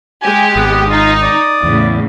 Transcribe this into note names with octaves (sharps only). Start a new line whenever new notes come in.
G#3 G4 G#5
G#1 B3 D#6
D#4 F4
D5
E2 A2 C#3